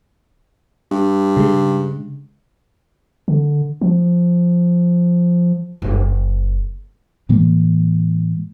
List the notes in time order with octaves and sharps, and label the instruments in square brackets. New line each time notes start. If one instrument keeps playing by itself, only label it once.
[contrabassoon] G2
[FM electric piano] C#3 G#3
[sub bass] D3
F3
[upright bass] F#1
[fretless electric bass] A2 E3 G#3 A#3